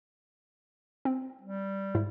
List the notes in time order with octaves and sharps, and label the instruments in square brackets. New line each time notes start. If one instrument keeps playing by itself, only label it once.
[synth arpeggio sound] C4
[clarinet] G3
[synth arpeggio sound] G#2 E4